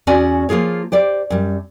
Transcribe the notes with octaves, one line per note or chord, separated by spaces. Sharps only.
E2 C#4 F#4 D5 G#5
F3 A#3 F4 G#4 C#5
G4 C5 D5
F#2 G3